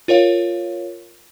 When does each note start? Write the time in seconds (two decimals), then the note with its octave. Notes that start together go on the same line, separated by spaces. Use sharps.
0.08 F4 A#4 C#5 F5